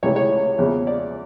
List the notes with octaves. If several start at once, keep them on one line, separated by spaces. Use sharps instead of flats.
C#2 C3 E3 A3 C#5
C#5
E2 C#3 F3
D5